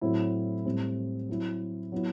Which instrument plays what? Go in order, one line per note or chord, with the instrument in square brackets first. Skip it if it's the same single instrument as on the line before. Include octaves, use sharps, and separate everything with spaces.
[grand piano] A2 F#3 A3 C4 E4
A2 G3 C4
F#3 C4 E4
F#3 B3 E4